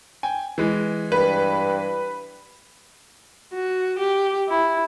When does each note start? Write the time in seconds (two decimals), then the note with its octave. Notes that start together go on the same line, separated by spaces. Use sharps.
0.23 G5 G#5
0.58 E3 G#3
1.12 G2 B4
3.54 F#4
3.98 G4
4.49 E4